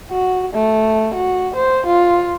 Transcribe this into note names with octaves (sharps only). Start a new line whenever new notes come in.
F#4
A3
F#4
C5
F4